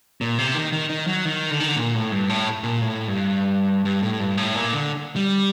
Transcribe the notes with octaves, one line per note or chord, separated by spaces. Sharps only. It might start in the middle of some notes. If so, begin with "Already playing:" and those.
A#2
C3
D#3
D#3
D#3
F#3
D#3
D3
D#3
D3
A#2
A2
G2
A2
A#2
A2
G2
G2
A2
G2
A2
A#2
D3
G3